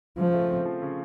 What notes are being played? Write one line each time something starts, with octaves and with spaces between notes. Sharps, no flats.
C#3 F3
A3
C4
F3
C#3